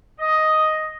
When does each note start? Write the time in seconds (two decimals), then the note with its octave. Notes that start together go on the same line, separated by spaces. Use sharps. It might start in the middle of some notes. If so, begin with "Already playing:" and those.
0.18 D#5